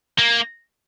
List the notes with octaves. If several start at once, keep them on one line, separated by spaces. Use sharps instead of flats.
A#3